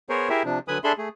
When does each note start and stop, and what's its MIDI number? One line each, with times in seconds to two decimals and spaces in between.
0.09 0.29 59
0.09 0.29 68
0.09 0.29 70
0.09 0.29 72
0.09 0.29 73
0.30 0.43 64
0.30 0.43 67
0.30 0.43 68
0.30 0.43 70
0.30 0.43 76
0.45 0.59 48
0.45 0.59 53
0.45 0.59 62
0.68 0.78 50
0.68 0.78 54
0.68 0.78 71
0.68 0.78 80
0.68 0.78 83
0.68 0.78 87
0.84 0.93 62
0.84 0.93 68
0.84 0.93 69
0.84 0.93 76
0.84 0.93 83
0.84 0.93 84
0.98 1.09 57
0.98 1.09 68